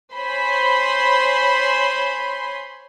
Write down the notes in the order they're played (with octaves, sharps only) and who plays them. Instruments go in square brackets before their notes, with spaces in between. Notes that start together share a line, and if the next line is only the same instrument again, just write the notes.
[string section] C5 C#5 G#5 B5 C6